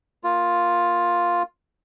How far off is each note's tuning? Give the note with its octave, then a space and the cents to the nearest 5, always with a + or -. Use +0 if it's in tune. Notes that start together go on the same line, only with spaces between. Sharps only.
A#3 +0 F4 +5